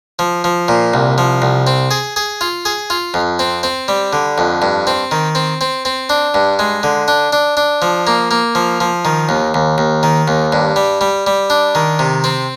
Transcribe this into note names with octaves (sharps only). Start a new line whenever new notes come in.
F3
F3
A#2
C2
F3
C2
C4
G#4
G#4
F4
G#4
F4
F2
C4
C4
G3
D3
F2
G2
C4
D#3
C4
C4
C4
D4
G2
G#3
D3
D4
D4
D4
F3
A#3
A#3
F3
F3
D#3
D#2
D#2
D#2
D#3
D#2
G2
G3
G3
G3
D4
D#3
C3
C4